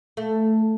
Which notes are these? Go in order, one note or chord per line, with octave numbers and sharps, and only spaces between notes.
A3